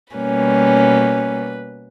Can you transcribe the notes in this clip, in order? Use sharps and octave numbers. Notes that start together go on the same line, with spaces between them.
B2 G3 A#3 C#4 B4